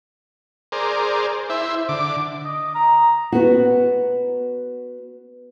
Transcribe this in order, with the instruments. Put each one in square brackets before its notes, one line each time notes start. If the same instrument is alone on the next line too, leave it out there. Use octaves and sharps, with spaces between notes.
[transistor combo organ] G#4 A#4 C5 D5
E4 C5 E5
D3 D6
[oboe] D#5
A#5
[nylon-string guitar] B3 F#4